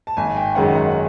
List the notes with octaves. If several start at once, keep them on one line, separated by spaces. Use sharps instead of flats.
A5
G#1 G#5
G5
F#2 D#3 G#3 C#4 F#5
F#5